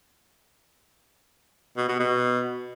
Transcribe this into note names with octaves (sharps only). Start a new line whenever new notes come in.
B2
B2
B2